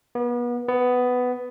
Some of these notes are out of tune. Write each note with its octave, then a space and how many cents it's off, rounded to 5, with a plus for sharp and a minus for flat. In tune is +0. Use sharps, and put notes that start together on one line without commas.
B3 -35
B3 +10